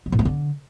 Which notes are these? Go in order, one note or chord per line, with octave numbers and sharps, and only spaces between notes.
F#3
A2
A3
D3